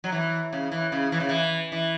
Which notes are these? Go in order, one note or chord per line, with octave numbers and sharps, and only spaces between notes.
F#3
E3
C#3
E3
C#3
E3
C#3
E3
E3